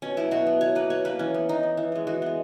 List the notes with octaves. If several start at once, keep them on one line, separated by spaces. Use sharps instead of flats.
B2 C#4
F#3 B3 E4
B2 F#4
F#3 B3
B2 C#5
F#3 A#3 B4
B2 C#5
F#3 A#3 B4
E3 C#4
B3
E3 D#4
B3
E3
G#3 B3
E3 F#4
G#3 B3